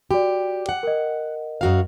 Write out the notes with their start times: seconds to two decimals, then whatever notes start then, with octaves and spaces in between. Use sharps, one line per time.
0.11 F#4 G4 D5
0.69 F#5
0.83 A#4 D#5
1.61 F#2 F#4 F5